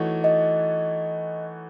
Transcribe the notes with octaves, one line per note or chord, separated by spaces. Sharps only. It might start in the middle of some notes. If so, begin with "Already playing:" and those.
Already playing: E3 A3 D#4 F#4 C#5
D#5